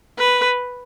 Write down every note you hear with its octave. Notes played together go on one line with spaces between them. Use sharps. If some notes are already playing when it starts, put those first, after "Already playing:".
B4